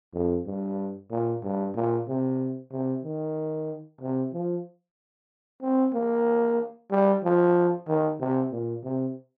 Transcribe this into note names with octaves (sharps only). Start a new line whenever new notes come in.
F2
G2
A#2
G2
A#2
C3
C3
D#3
C3
F3
C4
A#3
G3
F3
D#3
C3
A#2
C3